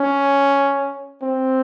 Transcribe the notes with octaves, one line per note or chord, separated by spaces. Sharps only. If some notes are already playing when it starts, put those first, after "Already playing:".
Already playing: C#4
C4